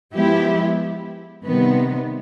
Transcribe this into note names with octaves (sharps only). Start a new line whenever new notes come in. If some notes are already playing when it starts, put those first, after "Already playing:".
F3 G#3 B3 E4 G4
C3 D#3 G3 B3